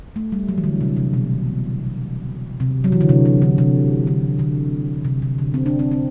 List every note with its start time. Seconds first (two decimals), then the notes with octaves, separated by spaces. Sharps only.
0.16 A3
0.32 G3
0.49 F#3
0.58 E3
0.64 D3
0.81 C3
0.97 C3
1.13 B2
2.60 C3
2.84 F#3
2.92 E3
3.01 D3
3.09 C3
3.25 C3
3.42 D3
3.58 C3
4.07 D3
4.39 D3
5.05 C3
5.22 C3
5.38 D3
5.54 C4
5.66 D4
5.79 C4
5.91 C4